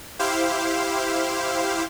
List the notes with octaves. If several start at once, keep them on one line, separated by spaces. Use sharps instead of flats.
E4 G4 C5 F5